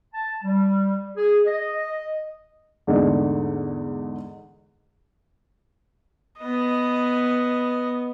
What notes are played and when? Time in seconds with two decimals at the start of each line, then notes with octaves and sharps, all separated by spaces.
0.13 A5
0.43 G3
1.16 G#4
1.46 D#5
2.87 E2 G#2 D3 A3 D#4
6.40 B3 D#5